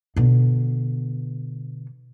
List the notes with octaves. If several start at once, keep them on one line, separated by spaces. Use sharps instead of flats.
B2 D3